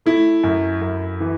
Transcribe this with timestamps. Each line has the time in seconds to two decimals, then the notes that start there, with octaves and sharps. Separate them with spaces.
0.06 A3 E4
0.43 F#2
0.81 F#2
1.20 E3